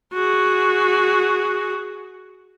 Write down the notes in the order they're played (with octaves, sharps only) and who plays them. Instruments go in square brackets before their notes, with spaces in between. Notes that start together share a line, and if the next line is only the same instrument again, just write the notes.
[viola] F#4 G#4